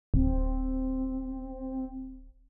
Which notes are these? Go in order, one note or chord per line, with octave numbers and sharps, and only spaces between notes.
D1 C4